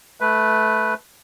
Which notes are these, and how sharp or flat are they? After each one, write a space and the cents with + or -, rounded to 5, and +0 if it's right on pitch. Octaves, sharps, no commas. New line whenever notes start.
A3 -15 B4 +0